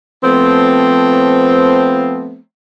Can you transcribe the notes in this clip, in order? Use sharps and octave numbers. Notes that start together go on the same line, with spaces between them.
F3 A3 B3 C4